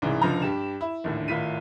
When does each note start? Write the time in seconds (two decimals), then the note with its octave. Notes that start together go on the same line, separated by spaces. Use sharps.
0.02 C2 G#2 C#3 E3
0.22 F1 C#2 D3 F3 A#5
0.42 G2 G4 E7
0.81 E4
1.04 A#1 D#2 A2 D3
1.28 G#1 A2 F4 B6 D#7